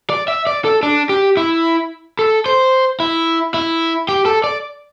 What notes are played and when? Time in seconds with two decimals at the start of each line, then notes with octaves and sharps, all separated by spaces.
0.10 D5
0.28 E5
0.47 D5
0.65 A4
0.83 D4
1.09 G4
1.37 E4
2.19 A4
2.46 C5
3.00 E4
3.54 E4
4.09 G4
4.26 A4
4.44 D5